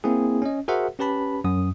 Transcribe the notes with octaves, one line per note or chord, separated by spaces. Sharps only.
A#3 C4 E4 G#4
C#4 D#5
F#4 G#4 A#4 C5 E5 F#5
C#4 G4 B4 A5 B5
F#2 D#6